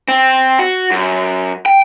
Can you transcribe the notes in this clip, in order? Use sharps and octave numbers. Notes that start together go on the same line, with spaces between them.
C4
F#4
F#2
G5